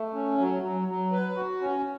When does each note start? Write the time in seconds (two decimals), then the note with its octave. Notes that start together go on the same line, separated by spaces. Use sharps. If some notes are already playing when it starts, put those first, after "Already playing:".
Already playing: A3
0.14 C#4
0.38 F#3
0.62 F#3
0.88 F#3
1.12 B4
1.36 F#4
1.61 C#4